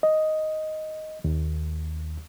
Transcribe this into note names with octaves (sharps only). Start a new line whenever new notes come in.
D#5
D#2